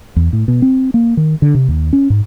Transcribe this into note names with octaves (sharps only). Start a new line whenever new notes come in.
E2
A2
B2
C4
A#3
D#3
D3
C3
D#2
C#4
G#2